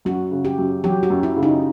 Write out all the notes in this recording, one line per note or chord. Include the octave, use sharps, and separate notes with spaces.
F#2 F#4
C#3
G4
F#2
F#3 G4
F#4
F#2
E4
C#3
D#4